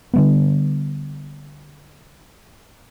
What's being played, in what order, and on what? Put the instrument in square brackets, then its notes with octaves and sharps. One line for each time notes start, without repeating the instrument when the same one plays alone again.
[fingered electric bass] D3 G3 B3